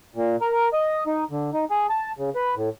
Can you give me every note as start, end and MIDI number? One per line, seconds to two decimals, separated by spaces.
0.16 0.36 46
0.41 0.69 70
0.73 1.04 75
1.07 1.24 63
1.31 1.50 50
1.53 1.65 63
1.70 1.87 68
1.90 2.12 81
2.19 2.30 49
2.35 2.55 71
2.56 2.69 45